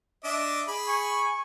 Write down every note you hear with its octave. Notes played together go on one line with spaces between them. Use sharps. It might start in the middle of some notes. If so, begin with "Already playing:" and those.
D4 D#5 E5 D6
G#4 B5
G#5 C#6